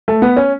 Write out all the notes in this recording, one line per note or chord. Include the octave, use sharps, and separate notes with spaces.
A3
B3
C#4